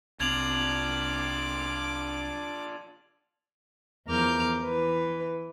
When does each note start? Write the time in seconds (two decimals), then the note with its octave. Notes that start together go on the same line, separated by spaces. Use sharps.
0.20 C2 C4 D4 F4 D6 G#6 F7 F#7
4.07 E2 F3 A#4 D6 F6 G6
4.64 E3 B4